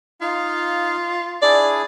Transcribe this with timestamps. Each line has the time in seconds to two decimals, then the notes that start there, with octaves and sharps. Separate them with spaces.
0.21 D#4 F4 F5
1.42 D4 E4 G#4 D5